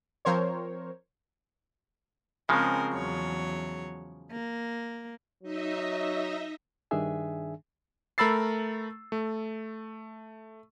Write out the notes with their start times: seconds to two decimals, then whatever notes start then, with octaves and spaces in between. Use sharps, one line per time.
0.25 F3 C4 A#4 C5 C#5
2.49 C#3 F3 G#3 C4 C#4 A#4
2.92 E2 F#3 C#5
4.31 A#3
5.43 F#3 D#4 D#5 E5
6.91 G2 D#3 D4 G#4 E5 G#5
8.18 A3 A#4 B5 E6 A6 C7
9.12 A3